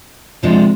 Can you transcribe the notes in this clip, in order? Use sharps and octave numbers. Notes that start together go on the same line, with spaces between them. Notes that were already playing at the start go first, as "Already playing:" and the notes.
C3 F3 G#3 D4